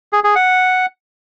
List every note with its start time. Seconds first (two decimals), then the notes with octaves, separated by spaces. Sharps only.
0.13 G#4
0.24 G#4
0.35 F#5